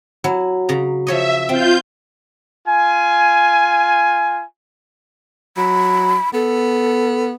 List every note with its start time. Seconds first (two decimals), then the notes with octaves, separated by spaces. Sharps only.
0.24 F#3 E4
0.69 C#3 A#5
1.07 F3 C#5 D#5 E5
1.49 C4 F4 G6
2.67 F4 G#5
5.57 F#3 B5
6.34 B3 A4